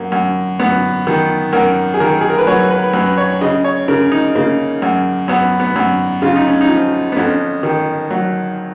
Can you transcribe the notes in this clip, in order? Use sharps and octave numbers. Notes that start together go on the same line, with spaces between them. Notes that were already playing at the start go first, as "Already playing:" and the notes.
Already playing: F#2 A#3
F#2
F#2 B3
D#3
F#2 A#4
G#4
D#3 A#4
G#4
A#4
B4
F#3 C#5
B4
F#2 B4
C#5
C#3 D#5
C#5
C#3 A#4
D#4
C#3 A#3
F#2
F#2 B3
B3
F#2
C#3 F4
D#4
C#4
D#4
F3
B3
F2 C#4
D#3
F#3